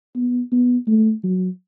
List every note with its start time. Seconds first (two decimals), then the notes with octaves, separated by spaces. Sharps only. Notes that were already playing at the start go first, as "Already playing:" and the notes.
0.16 B3
0.52 B3
0.87 A3
1.24 F#3